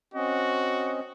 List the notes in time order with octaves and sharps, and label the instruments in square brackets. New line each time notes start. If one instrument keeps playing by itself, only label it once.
[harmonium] C4 C#4 D#5 [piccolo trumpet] F#4